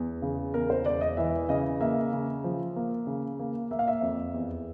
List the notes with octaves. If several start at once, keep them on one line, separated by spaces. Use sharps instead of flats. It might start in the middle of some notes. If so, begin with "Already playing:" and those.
Already playing: E2
C#3
E2 A#4
C5
E1 D5
D#5
E3 E5
C#3 D#5
A#3 E5
C#3
F3
A#3
C#3
A#3
A#3 E5
F5
E5
F2
E2